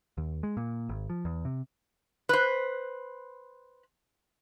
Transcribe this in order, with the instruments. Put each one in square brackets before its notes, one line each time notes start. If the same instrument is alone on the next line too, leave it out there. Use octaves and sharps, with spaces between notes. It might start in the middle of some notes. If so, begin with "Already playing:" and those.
[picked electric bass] D#2
G#3
A#2
G#1
F3
E2
C3
[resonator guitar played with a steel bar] B4 C5